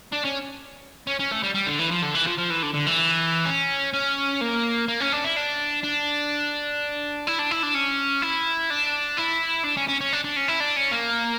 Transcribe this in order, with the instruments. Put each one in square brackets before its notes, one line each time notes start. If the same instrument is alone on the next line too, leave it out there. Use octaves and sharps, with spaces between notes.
[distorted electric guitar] D4
C#4
C#4
C#4
A3
G3
G3
D3
E3
F3
D3
E3
F3
F3
E3
D3
D3
E3
C#4
C#4
A#3
A#3
C#4
D4
E4
D4
D4
E4
D4
E4
D4
C#4
E4
D4
E4
D4
C#4
C#4
C#4
D4
D4
C#4
E4
D4
C#4
A#3